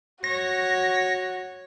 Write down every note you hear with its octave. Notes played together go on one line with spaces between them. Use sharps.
F#4 C#5 A#6